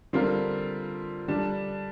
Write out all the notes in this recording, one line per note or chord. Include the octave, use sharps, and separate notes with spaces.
D3 G3 C4 F4 A#4
D3 G3 D4